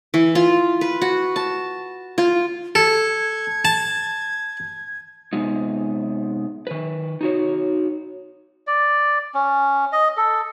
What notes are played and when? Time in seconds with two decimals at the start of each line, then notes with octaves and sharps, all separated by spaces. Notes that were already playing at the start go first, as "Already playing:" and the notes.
0.14 E3
0.35 F4
0.81 B4
1.02 F#4
1.36 A5
2.18 F4
2.75 A4 G#6
3.65 A5
5.33 C3 G#3 B3 D#4
6.67 D#3 B4
7.21 D#4 F#4 C#5
8.67 D5
9.34 C#4
9.92 D#5
10.17 A4